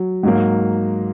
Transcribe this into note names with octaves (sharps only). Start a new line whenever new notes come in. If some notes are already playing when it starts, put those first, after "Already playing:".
Already playing: F#3
G#2 F#3 A#3